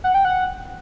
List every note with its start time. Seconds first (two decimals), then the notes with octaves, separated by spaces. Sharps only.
0.04 F#5
0.14 G5
0.25 F#5